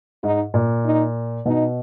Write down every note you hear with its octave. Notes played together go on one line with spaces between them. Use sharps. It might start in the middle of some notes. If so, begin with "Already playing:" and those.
G#2 D#4
A#2
D#4
B2 D#4